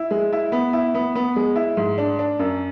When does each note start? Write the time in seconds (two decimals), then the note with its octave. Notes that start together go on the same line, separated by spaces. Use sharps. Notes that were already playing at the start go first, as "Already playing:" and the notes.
Already playing: E4
0.11 G#3
0.33 E4
0.52 B3
0.73 E4
0.95 B3
1.15 B3
1.36 G#3
1.56 E4
1.77 G#2
1.98 D4
2.19 D4
2.39 F#2